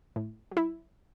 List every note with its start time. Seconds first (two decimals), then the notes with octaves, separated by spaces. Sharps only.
0.16 A2
0.51 F#3
0.57 E4